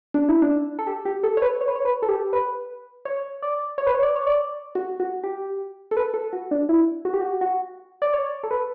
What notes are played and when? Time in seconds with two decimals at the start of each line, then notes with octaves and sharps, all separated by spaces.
0.14 D4
0.29 E4
0.42 D4
0.79 A4
0.87 G4
1.05 G4
1.23 A4
1.37 C#5
1.42 B4
1.61 C#5
1.68 B4
1.76 C#5
1.85 B4
2.02 A4
2.09 G4
2.33 B4
3.05 C#5
3.42 D5
3.78 C#5
3.87 B4
3.95 C#5
4.03 D5
4.16 C#5
4.27 D5
4.75 F#4
5.00 F#4
5.24 G4
5.91 A4
5.97 B4
6.14 A4
6.33 F#4
6.51 D4
6.69 E4
7.05 F#4
7.14 G4
7.21 F#4
7.41 F#4
8.02 D5
8.14 C#5
8.43 A4
8.51 B4